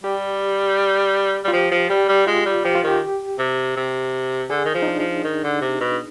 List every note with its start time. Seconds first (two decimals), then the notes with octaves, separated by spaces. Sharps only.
0.04 G3 G4
1.44 G3
1.48 F4
1.52 F3 G4
1.71 F3
1.90 G3 G4
2.08 G3
2.27 G#3 F4
2.45 G3
2.65 F3 G4
2.75 F4
2.83 D#3 G4
3.38 C3
3.76 C3
4.50 D3 G#4
4.65 D#3
4.74 F3
4.82 D#4
4.88 D4
4.99 F3
5.24 D#3
5.43 D3
5.61 C3
5.80 B2